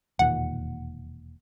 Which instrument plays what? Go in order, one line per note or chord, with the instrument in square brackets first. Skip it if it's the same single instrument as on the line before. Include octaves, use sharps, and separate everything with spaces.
[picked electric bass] E1 D#2 A#2 [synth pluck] F#5